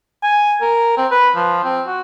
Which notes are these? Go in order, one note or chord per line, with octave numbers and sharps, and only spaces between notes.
G#5
A#4
C4
B4
F3
C4
F#4